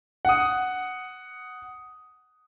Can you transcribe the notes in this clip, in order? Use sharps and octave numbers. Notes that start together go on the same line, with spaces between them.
F#5 D#6